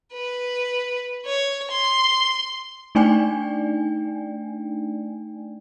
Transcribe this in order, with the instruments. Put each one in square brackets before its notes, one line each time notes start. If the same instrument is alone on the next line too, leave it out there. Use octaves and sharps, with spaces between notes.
[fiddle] B4
C#5
C6
[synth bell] A3 D4 D#4 D5 G5 G#5